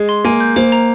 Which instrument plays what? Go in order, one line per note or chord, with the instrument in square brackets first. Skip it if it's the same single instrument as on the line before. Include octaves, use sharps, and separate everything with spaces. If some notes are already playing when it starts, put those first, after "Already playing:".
Already playing: [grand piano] G#3
[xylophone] C6
[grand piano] A#3 [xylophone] G#5
[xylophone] G6
[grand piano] A#3 [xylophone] C5
[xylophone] A#5